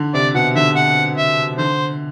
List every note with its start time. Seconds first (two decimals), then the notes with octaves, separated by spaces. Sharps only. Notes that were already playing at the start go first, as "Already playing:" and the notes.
Already playing: D3
0.14 C3 D5
0.34 B2 F#5
0.55 D3 E5
0.76 F#5
1.17 E5
1.58 D3 C5